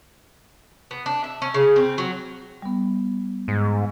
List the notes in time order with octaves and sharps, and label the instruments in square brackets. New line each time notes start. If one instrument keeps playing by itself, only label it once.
[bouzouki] B3
D4
E5
C#4
C#3
C4
F#3
[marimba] G3 B3
[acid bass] G#2